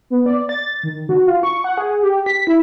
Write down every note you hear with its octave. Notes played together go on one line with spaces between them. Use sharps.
B3
D5
A6
D#3
F#4
F4
C#6
F#5
G#4
G4
B6
E4